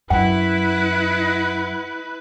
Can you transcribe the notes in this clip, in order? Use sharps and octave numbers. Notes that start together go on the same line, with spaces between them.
F#2 E4 B4 F#5